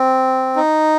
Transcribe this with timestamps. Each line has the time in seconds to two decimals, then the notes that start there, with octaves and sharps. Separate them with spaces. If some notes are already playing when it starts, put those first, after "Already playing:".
Already playing: C4
0.56 D#4